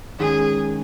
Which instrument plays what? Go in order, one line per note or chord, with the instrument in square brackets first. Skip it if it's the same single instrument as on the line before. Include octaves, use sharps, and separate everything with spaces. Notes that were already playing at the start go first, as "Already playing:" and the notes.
[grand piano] D#3 G#3 C#4 [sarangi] G#4